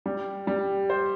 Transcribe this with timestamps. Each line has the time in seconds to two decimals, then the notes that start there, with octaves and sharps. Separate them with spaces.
0.06 G3
0.47 G3
0.90 C5